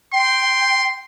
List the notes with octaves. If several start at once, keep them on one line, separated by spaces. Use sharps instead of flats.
G5 C6